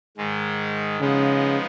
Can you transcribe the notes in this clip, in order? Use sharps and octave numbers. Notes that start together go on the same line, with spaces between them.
G#2 D#3 G#3
C#3 F3 G#3 B3 D#4